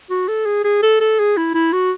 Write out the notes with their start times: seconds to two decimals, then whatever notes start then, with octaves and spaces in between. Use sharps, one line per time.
0.10 F#4
0.28 A4
0.46 G#4
0.65 G#4
0.83 A4
1.01 A4
1.19 G#4
1.37 E4
1.54 E4
1.73 F#4